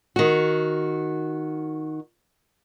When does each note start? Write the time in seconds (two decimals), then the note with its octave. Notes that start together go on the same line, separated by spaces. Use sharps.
0.16 D#3 F#4